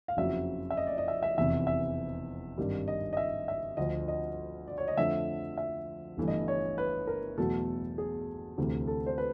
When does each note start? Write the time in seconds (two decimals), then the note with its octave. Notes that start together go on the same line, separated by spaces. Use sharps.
0.08 F5
0.17 F#1 F2 C#3 F#3 E5
0.70 E5
0.77 D#5
0.87 D5
0.98 D#5
1.08 E5
1.23 E5
1.38 F1 E2 C3 E3 E5
1.67 E5
2.58 G#1 G2 D#3 G3
2.88 D#5
3.13 D#5
3.17 E5
3.48 E5
3.77 D2 D3 F3 D#5
4.08 D#5
4.67 D5
4.78 C#5
4.88 D#5
4.97 F2 D3 F3 A3 E5
5.58 E5
6.17 G1 G2 E3 A3
6.28 D#5
6.48 C#5
6.78 B4
7.07 A#4
7.38 E2 B2 F#3 A3 A4
7.98 G#4
8.57 D2 C3 E3 A3
8.87 A4
9.06 C5
9.18 B4